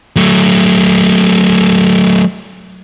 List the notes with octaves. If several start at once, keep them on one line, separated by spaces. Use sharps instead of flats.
F#3 A3